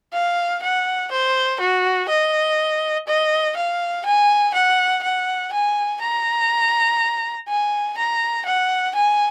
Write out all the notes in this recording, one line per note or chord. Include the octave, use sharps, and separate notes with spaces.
F5
F#5
C5
F#4
D#5
D#5
F5
G#5
F#5
F#5
G#5
A#5
G#5
A#5
F#5
G#5